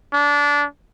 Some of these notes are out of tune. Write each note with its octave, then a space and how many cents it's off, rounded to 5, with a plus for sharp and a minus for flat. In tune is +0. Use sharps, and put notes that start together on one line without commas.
D4 -20